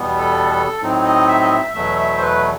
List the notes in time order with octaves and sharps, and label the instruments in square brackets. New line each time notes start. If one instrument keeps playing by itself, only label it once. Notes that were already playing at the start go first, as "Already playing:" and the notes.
Already playing: [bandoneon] E2 B2 G3 B3
A4
A4
A2 F#3 C4 D#4
D#5
E5
D#5
E5
E2 B2 F#3 A3 E5
E5
C5
B4